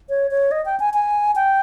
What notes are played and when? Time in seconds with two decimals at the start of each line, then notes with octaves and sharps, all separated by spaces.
0.09 C#5
0.31 C#5
0.51 D#5
0.66 G5
0.80 G#5
0.94 G#5
1.36 G5